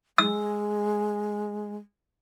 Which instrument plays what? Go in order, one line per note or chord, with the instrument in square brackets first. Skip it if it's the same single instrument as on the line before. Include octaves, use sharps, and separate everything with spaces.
[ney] G#3 [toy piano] E6